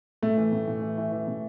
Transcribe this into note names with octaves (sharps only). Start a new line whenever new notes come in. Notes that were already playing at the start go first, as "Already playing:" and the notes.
A2 A3
E3
A2
A2
E3
E3
E3
A2